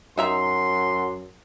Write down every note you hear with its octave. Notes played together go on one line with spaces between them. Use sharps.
F#2 D#4 E5 A#5 C6